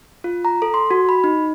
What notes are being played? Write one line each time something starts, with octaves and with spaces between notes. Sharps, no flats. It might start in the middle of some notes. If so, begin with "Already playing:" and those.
F4
A#5
A4
C6
F#4
B5
D#4